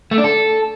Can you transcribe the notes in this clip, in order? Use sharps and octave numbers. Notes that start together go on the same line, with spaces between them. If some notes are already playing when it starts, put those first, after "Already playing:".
A3
D4
A4